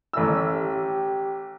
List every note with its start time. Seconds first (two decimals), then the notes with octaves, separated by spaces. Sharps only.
0.13 A1 E6
0.53 G4